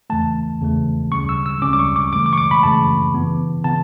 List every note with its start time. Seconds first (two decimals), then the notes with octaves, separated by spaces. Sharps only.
0.10 E2 C#3 E3 A3 A5
0.61 E2 C#3 E3 A3
1.11 D2 C#3 G3 C#4 C#6
1.29 E6
1.46 E6
1.62 D2 C#3 G3 C#4 D6
1.73 D6
1.79 C#6
1.96 D6
2.13 F#2 C#3 E3 A3 D6
2.26 D6
2.33 C#6
2.38 D6
2.51 B5
2.63 F#2 C#3 E3 A3 A5
3.14 C#3 E3 B3
3.64 C#3 E3 B3 A5